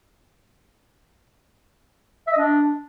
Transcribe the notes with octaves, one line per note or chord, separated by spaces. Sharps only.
E5
D#5
D4